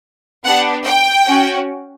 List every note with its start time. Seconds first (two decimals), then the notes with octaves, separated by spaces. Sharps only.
0.44 B3 D4 G4 F#5
0.85 G5
1.27 C#4 F#4